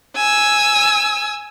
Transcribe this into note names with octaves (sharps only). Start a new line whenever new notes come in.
G#5 E6